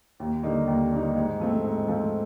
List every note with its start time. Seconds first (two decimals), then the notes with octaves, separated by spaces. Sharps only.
0.20 D#2
0.43 D3 G3 A#3 D#4
0.67 D#2
0.92 D3 G3 A#3 D#4
1.16 G#2
1.40 F3 A3 C4
1.64 G#2
1.88 F3 A3 C4